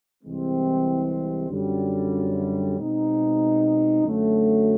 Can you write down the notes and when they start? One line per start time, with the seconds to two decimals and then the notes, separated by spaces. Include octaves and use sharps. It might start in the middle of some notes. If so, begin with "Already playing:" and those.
0.23 C2 C3 E3 G#3 C4
1.50 F#2 D3 G3
2.77 B2 G#3 C4 D#4
4.04 F#2 D3 F#3 A3